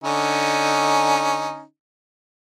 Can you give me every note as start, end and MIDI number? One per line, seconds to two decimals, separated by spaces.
0.04 1.63 50
0.04 1.63 61
0.04 1.63 63